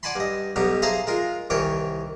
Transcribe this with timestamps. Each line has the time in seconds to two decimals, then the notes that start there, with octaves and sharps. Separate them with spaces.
0.03 D5 F#5 G#5 A5 B5 C6
0.16 G2 D#5
0.56 B1 G2 B2 D#4 G4
0.82 G#4 C5 E5 F5 A5 A#5
1.07 G#3 F4 A#4
1.50 C2 D#3 E3 C#5 G5